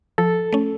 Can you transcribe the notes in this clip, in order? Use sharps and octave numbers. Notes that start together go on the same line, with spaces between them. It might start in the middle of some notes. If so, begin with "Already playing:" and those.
F3 A4
A3 C#4